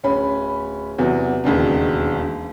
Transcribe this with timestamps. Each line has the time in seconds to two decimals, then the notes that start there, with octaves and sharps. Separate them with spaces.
0.04 D1 C#4 B5
0.98 E2 C3 F#3
1.44 E1 D#2 C#3 D4